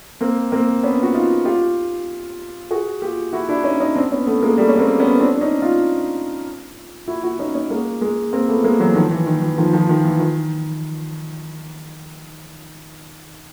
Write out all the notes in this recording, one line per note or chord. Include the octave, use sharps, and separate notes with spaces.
A#3 C4
A#3 C4
B3 C#4
F#4
D#4 F4
F4 G4
F#4 G#4
F4 G4
E4 F#4
D4 E4
C#4 D#4
C#4 D#4
C4 D4
B3 C#4
A3 B3
G#3 A#3
G3 A3
C#4
A#3 C4
B3 C#4
C4 D4
D4
C#4 D#4
D#4 F4
E4 F#4
E4 F#4
C#4 D#4
C#4 D#4
G#3 A#3
G#3 A#3
A#3 C4
A3 B3
G#3 A#3
E3 F#3
D#3 F3
E3
D#3
E3
D#3 F3
D#3 F3
D#3
E3
D#3